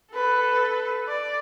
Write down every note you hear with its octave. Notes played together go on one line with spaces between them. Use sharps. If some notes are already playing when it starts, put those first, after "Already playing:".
A4 B4
D5